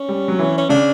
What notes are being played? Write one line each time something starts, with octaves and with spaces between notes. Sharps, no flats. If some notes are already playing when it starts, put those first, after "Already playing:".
Already playing: C#4
G3
F#3
E3
C#4
C#3 D4